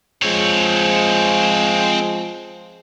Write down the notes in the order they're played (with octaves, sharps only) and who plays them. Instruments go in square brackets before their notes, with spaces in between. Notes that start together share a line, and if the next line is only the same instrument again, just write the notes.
[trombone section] F3 G#3 [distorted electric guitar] C4 C#5